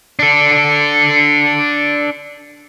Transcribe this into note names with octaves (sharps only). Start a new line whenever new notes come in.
D4 A4